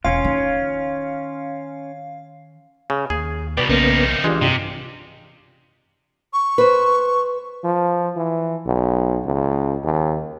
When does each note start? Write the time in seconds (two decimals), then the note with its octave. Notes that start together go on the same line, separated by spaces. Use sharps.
0.05 E1 C#4 F4 F5
0.24 D#3
2.90 C#3
3.10 D#2 G#4
3.57 C2 B2 B4 D5 G5
3.69 B1 C#3 F3 A#3 B3 D#4
4.24 E3 G#3 D4 F4 G4
4.41 G2 C3
6.33 C#6
6.58 B4 C5
7.64 F3
8.16 E3
8.66 B1
9.25 C#2
9.83 D#2